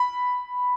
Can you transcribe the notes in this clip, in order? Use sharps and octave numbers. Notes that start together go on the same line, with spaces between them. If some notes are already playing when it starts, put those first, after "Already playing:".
Already playing: B5